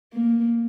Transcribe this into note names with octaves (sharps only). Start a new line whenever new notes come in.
A#3